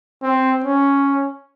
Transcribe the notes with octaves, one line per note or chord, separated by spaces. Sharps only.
C4
C#4